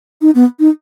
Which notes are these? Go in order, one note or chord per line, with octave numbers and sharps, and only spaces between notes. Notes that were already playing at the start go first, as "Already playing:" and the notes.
D#4
B3
D#4